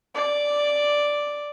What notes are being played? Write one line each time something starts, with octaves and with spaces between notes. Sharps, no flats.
D5